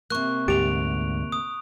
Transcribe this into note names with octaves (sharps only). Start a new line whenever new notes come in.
C3 A#3 C#6 F#6
D2 G#2 G4 D7 F7
D#6